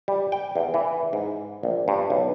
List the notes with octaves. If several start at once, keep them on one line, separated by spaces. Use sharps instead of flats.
G3
G5
E2
E3
G#2
A#1
G2
B1